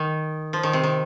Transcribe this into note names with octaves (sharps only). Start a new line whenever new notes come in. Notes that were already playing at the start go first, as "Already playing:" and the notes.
Already playing: D#3
F3
D#3
C3
D#3